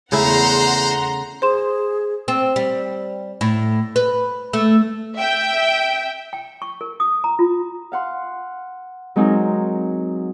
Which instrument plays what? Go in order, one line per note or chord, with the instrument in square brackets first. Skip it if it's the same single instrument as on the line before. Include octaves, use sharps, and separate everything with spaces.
[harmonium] E2 [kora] C#3 A3 E4 [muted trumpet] C5 [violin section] F#5 A#5 C6
[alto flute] G#4 [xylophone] C5 C6 E7
[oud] C4
G3
A2
B4
A3
[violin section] E5 G5
[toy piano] G5
C#6
A#4
D#6
A#5
F4
[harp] F5 F#5 C6
F#3 G#3 C4 D#4 G#4 A#4